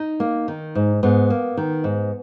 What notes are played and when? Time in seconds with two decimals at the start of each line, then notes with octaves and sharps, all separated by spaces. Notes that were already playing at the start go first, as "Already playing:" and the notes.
Already playing: D#4
0.20 A#3
0.48 D#3
0.75 G#2
1.03 G#2 B3
1.30 A#3
1.57 D#3
1.84 G#2